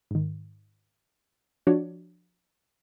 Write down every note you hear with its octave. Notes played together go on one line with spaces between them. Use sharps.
G#2 D#3
F3 D4 F#4 C#5 D5